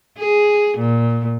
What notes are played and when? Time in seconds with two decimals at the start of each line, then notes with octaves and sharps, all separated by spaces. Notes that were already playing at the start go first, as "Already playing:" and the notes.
0.18 G#4
0.78 A#2